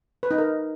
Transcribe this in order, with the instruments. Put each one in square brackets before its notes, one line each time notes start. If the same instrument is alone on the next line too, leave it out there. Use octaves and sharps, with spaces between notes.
[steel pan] B4
D#4
A#4